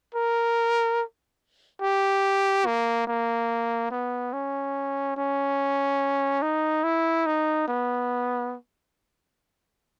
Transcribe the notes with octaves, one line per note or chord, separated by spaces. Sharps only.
A#4
G4
A#3
A#3
B3
C#4
C#4
D#4
E4
D#4
B3